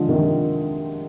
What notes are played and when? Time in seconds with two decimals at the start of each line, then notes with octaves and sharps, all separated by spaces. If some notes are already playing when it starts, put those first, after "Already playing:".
Already playing: D3 F3 G#3
0.08 C3 D#3